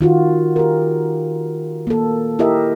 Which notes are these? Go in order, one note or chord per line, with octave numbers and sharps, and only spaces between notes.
D#3 F4 F#4
G4 A#4
A#3 A4
E4 G4 A#4 D#5 E5